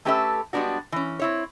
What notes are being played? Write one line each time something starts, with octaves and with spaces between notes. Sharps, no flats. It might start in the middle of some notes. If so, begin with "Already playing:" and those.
A3 C#4 G4 A4 B4 E5
G3 G#3 B3 D4 F#4
E3 C#4
C4 E4 C#5